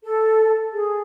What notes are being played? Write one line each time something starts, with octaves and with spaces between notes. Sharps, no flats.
A4
G#4